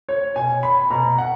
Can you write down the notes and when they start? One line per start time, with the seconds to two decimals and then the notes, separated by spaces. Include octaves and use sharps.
0.09 C#5
0.36 B2 G#5
0.63 B5
0.90 B2 A#5
1.18 F#5